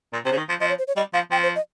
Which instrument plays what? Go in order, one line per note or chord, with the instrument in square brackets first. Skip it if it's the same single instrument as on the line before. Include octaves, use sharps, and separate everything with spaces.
[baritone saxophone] A#2
[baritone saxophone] C3 [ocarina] C5
[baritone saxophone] C#3
D#3
F3
[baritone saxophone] F3 [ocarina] D#5
[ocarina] C#5
C5
C#5
[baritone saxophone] G3 [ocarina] D#5
[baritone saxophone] F3 [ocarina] F5
[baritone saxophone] F3 [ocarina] G5
[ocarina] C5
D#5